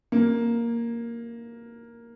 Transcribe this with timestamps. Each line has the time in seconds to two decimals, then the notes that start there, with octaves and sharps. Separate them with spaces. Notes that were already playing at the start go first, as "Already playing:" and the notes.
0.12 A#3